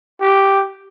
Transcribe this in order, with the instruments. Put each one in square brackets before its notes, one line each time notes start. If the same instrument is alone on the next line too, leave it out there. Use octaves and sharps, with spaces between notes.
[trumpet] G4